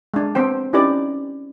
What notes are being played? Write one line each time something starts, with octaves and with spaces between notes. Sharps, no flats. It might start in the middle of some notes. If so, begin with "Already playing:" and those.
G#3 D4
B3 C4 C5 G5
C#4 D#4 E4 G4 B4 D5